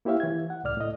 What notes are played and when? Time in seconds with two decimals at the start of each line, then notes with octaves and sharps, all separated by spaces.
0.05 A#3 E4 G4 C#5 E5 F5
0.20 E3 G#6
0.50 F#5
0.64 C#2 A2 D5 F6
0.77 A2 D#5